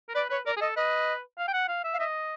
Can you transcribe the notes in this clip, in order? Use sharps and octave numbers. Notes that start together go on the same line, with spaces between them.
A#4
B4 D5
B4 C#5
A#4 D5
G#4
A4 D#5
B4 D#5
F5
G5
F#5
F5
E5
F5
D#5 E5